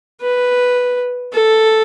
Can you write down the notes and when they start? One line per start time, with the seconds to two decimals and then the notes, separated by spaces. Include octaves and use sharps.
0.21 B4
1.32 A4